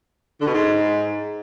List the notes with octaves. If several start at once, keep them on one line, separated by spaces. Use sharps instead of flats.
D3
B2
G#2